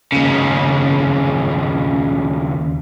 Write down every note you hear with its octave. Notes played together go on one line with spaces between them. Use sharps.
D#2 C#3